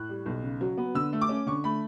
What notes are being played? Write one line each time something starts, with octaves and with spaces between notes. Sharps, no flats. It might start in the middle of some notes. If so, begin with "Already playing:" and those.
Already playing: A2 F#6
G3
B1
C#3
F#3
B3
D3 E6
A3
D6
C#4
D3 C#6
A3 B5